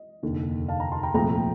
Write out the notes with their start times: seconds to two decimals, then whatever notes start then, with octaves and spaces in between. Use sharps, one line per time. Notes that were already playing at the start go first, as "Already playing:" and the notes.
Already playing: D#5
0.23 F1 D#2 D3
0.68 F5 A5
0.80 G5 A#5
0.92 A5 C6
1.03 G5 A#5
1.14 C2 A#2 F3 A3 G5 A#5